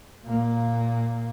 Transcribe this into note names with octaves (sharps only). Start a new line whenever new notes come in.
A#2 A#3